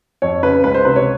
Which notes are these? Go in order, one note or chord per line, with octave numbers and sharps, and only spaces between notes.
F2 C#5
C#3 B4
C#2 B4
C5
C3 B4
C#5